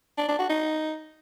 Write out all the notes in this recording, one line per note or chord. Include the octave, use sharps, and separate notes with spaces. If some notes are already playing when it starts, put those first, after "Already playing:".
D4
D4
F#4
D#4